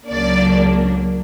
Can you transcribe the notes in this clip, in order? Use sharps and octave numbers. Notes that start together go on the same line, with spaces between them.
C#2 C#3 F#3 A#3 D4 D5